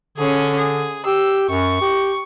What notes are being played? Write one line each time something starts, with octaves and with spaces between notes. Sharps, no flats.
D3 C#4 G#4
G#4
G4 E6
F#2 C#6
G4